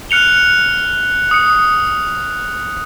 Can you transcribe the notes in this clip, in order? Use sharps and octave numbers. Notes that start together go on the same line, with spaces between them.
F6 F#6 C#7 F7 G7
D#6 C#7